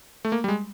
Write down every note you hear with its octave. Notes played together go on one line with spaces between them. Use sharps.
A3
A#3
G3
G#3